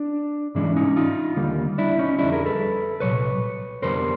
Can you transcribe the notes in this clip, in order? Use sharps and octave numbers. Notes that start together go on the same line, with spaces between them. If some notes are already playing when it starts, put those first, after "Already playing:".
Already playing: D4
G#2 E3 G#3 C#4 D4
C#4 D#4
D#4 F4
D#2 D3 G3 A#3
D4 E4
C#4 D#4
F2 D3 G3 D4 E4
G#4 A#4
A4 B4
C2 A#2 F#3 B4 C#5
F2 D3 G3 B3 A#4 C5